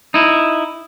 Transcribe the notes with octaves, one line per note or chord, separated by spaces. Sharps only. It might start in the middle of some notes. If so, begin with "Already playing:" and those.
D#4 E4